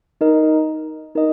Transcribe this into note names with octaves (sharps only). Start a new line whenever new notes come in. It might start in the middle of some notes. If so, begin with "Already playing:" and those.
D#4 A#4 D#5
D#4 A#4 D#5